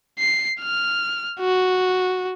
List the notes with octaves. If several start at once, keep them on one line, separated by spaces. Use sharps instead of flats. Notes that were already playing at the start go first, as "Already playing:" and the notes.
C7
F6
F#4